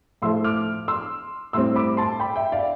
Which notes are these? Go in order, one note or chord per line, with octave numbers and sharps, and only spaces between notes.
A2 F3 A3 C6 E6
D6 F6
C6 E6
A2 G3 C4 C6 E6
B5 D6
A5 C6
G5 B5
E5 G5
D5 F5